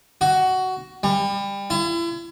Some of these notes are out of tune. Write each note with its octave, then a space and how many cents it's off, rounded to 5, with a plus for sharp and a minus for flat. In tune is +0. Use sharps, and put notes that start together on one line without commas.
F#4 +15
G3 +25
E4 +40